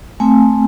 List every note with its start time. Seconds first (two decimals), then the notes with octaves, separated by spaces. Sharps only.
0.20 A3 C4 G#5